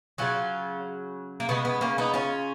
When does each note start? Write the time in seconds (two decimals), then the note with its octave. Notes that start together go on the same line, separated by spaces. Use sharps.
0.18 C#3 F#3 C#4 F4
1.40 A#3
1.49 C#3 G#3 B3
1.65 B3
1.81 A#3 C#4
1.98 B3 D#4
2.14 C#4 F4